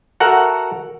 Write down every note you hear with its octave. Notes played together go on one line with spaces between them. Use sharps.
F#4 A4 A#4 E5 F#5